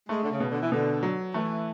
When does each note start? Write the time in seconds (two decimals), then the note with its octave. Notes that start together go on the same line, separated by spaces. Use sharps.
0.09 G#3 A3
0.23 D3
0.30 C#3
0.40 B2
0.51 D3
0.62 E3
0.72 B2 D3
1.03 F#3
1.34 E3 A3